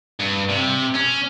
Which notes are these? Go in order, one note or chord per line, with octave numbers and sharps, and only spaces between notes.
G2
C3
C#4